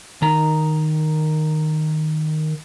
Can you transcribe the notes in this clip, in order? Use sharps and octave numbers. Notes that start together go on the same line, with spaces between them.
D#3 A#5